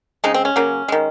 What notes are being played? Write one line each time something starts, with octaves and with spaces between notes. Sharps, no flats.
C#3 G#3 C4 D#4
C4
C#4
C#3 F#3 A#3
D#3 G#3